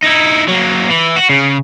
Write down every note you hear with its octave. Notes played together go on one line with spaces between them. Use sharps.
D#4 E4
F#3 A#3
E3
F#4
C#3